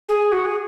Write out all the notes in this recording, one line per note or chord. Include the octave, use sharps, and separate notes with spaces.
G#4
F#4
G#4